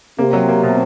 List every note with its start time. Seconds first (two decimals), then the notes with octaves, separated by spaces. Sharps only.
0.18 C3 A#3
0.33 F#3
0.48 A#3
0.63 B2